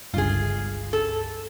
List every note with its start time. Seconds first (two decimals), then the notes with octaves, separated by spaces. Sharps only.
0.14 G1 C#2 G2 F4 G#4
0.93 A4